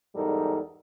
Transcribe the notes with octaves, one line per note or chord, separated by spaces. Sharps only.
E2 G#2 G3 D#4 A4 A#4